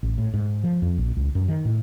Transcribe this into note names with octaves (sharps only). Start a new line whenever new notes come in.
A1
A2
G#2
F3
F2
A#1
C#2
F#2
D#3
A2